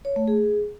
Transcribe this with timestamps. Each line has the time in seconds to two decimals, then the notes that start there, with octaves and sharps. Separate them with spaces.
0.05 C#5
0.16 A3
0.28 G#4